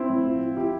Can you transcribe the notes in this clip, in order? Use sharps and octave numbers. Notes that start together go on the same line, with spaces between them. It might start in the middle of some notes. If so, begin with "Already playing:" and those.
Already playing: C4 E4
A2
F3
F3
F3 E4 G4